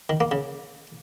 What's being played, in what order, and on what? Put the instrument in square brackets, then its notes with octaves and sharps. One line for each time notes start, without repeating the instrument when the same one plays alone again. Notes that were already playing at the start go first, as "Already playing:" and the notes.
[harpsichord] D#3
A#3
C#3